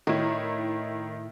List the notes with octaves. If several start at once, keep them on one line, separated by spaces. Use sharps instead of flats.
A2 D#3 E4